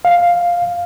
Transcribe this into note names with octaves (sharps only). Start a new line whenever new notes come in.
F5